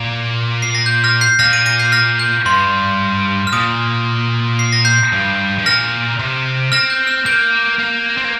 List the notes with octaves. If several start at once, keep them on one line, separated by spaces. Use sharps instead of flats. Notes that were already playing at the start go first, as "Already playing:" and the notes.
Already playing: A#2
C7
A#6
G6
F6 A#6
G6 C7
A#2 F6 A#6
A#6 D#7
A#6 D#7
G6 C7
F6 A#6
G6
G2 C6
F6
A#2 D#6
C7
A#6
G6 C7
G2
G2
A#2 F6 A#6
C3
C4 F6 A#6
G6
F6
A#3 G6
A#3
C4
A#3